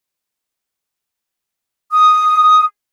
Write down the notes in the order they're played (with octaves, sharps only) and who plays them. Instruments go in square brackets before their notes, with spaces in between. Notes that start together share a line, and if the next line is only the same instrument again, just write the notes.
[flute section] D#6